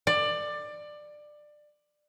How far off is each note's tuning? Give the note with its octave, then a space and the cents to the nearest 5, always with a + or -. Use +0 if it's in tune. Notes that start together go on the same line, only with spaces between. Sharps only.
D5 +20